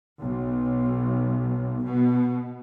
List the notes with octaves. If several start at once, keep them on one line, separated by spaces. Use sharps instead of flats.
B1
B2